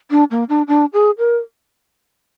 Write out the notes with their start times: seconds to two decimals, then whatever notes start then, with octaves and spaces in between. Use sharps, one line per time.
0.11 D4
0.31 A#3
0.49 D4
0.68 D4
0.93 G#4
1.18 A#4